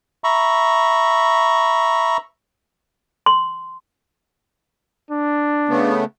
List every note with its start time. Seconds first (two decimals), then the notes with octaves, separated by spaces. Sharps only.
0.24 E5 A#5 B5 C#6
3.26 C6
5.11 D4
5.69 C#3 A3 B3